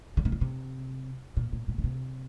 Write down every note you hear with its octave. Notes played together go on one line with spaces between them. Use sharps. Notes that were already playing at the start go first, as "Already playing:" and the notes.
D3
C3
D3
C3
A#2
A#2
A#2
D3
C3